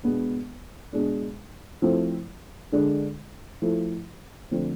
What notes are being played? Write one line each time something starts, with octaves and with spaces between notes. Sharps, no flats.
B2 G#3 B3 D4
B2 G#3 D4
F3 A3 C4 E4
D3 G#3 D4
F3 A3 E4
D3 F3 A3 C4